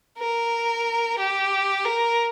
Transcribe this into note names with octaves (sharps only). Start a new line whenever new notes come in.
A#4
G4
A#4